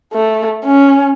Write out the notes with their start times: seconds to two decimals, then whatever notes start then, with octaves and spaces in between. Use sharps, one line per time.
0.13 A3
0.65 C#4